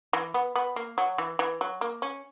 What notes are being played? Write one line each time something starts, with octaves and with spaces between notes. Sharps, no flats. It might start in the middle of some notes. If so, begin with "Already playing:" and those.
E3
B3
B3
A#3
F#3
E3
E3
F#3
A#3
C#4